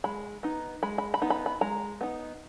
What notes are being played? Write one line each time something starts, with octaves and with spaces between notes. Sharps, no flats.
G#3 B5
B3 D#4
G#3 B5
B5
B5
B3 D#4
B5
B5
G#3 A#5
B3 D#4